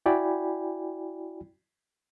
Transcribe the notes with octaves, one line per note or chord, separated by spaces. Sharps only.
E4 F#4 D5 G5 G#5 B5